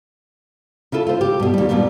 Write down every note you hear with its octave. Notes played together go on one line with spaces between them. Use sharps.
C#3 E4 F4 A4
F4 C5
G4
G2 B2
D#2 G3
F2 A#2 F3 G3 B3